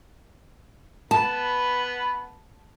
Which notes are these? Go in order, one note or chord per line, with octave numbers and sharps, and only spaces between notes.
B3 B4 A5